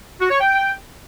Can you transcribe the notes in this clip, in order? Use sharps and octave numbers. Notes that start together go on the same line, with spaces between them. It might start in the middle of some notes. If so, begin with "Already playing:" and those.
F#4
C#5
G5